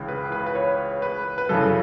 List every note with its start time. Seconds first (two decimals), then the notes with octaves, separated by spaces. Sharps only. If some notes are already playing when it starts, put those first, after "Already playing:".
Already playing: C#2 C#3 E3
0.08 B4
0.32 B4
0.46 B4
0.55 C#5
1.02 B4
1.38 B4
1.49 F#2 C#3 E3 A4